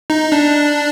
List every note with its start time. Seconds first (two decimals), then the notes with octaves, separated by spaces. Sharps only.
0.10 D#4
0.32 D4